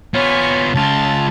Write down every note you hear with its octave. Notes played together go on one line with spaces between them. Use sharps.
B3 F4 C#5 G#5
C#2 F4 A5